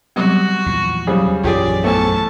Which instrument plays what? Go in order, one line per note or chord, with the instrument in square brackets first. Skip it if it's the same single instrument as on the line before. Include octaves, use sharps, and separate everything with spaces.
[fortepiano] C3 [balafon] F#3 G3 B3 [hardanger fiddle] F#4
[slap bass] E2 A#2 F3
[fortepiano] C#3 G3 G#4 [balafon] F#3 C5
[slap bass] A#1 F#2 E3 [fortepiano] C#4 G4 G#4 [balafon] F4 [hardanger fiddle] D5
[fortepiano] E2 A2 A3 [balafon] B3 C5 G#5 [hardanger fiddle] A5 C#6